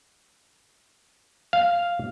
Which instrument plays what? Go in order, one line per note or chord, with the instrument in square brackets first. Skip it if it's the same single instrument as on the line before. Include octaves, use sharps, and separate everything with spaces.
[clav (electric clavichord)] F5